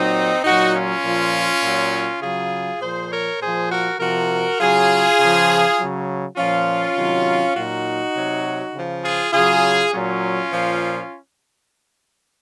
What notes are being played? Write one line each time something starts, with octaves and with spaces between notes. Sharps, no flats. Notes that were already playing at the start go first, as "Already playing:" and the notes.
Already playing: A#2 F#3 C4 D#4
A#2 F#3 D#4 F#4
C#4 F4
A#2 F3
A#2 F#3
C#3 F#3 F4 G#4
A#2 F3 G#4 C5
A#4 C#5
A#2 F3 G#4 C5
F#4 A#4
C3 F3 F#4 A#4
C#3 F#3 F4 G#4
C#3 F3
C#3 F#3
A#2 F3 C#4 F4
C3 D#3 F#3
A#2 F#3 D#4 F#4
C3 F#3
C#3 F3
F4 G#4
C#3 F#3 F4 G#4
A#2 F#3 C#4 F4
A#2 F3